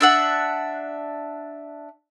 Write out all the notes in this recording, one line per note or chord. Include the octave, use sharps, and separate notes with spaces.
D4 E5 F#5